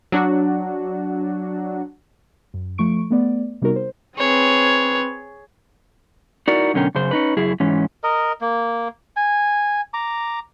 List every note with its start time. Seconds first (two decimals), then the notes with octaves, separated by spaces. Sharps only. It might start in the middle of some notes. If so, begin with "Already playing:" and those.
0.12 F#3 D4 F#4
2.54 F#2
2.78 F3 A3 C#6 D7
3.11 A3 B3 D5
3.62 C3 G3 B3 D#4 F#4 A#4
3.76 C5
4.17 C4 G#4 B4 C#5
6.48 D#4 E4 F#4 A#4 D5
6.74 F#2 B2 D3 C#4 A#4 G5
6.95 F#2 C#3 C5
7.11 C#4 D#4 B4
7.37 F#2 C#3 E4 G#4
7.60 G#2 E3 C#4
8.04 A#4 D#5
8.41 A#3
9.16 G#5
9.94 A#5 D6